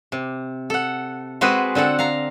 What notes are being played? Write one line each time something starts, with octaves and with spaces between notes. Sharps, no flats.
C3
A4 F#5
G#3 C4 F#4 G#4 B4
D3 C4 A4 F#5
F5 A#5